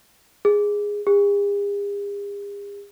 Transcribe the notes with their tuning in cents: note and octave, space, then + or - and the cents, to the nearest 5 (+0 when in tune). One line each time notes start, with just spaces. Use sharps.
G#4 -10
G#4 -45